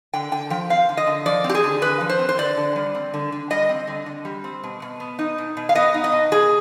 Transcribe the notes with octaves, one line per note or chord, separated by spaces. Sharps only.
D3 G5
D3 G5
F3 G5
C4 F5
D3
D#5
D3
F3 D5
C4
G4
G#4
D3
D3 B4
F3
C5
C4
C5
D3 D5
D3
G3
C4
D3
D3
G3 D#5
C4
D3
D3
G3
C4
B2
B2
B3
D#4
B2
B2
F5
B3 D#5
D#4
D#5
B2
B2 G#4